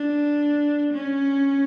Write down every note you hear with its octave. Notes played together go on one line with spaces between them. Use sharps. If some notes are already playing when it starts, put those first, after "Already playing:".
Already playing: D4
C#4